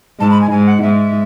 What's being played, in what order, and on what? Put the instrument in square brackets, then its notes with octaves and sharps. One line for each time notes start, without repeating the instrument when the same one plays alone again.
[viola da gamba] G#2 [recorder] A5
[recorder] B5
G#5
[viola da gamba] G#2 [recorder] G#5
[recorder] F#5
[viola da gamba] G#2 [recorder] E5